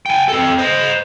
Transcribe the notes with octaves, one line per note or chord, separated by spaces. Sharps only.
G5 G#5
C4 A4
C5 D#5